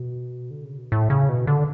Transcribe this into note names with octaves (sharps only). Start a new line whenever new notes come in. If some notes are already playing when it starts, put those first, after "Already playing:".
Already playing: B2
D3
C#3
B2
A2
C#3
B2
D3